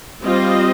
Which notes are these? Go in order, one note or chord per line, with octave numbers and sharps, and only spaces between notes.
G3 C4 F4 C5 D#5